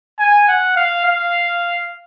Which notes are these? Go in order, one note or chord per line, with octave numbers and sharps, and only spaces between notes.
G#5
F#5
F5
F5